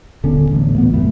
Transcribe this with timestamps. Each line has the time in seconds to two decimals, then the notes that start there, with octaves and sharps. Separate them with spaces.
0.24 D#1 D3 B3 C#4
0.51 A1 D2
0.78 A#2 E3 B3
0.94 F#2 A3 B3